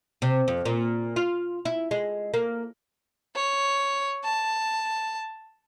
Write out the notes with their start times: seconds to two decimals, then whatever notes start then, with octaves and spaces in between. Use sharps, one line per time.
0.22 C3
0.48 F2
0.65 A#2
1.16 F4
1.65 E4
1.91 G#3
2.34 A#3
3.35 C#5
4.24 A5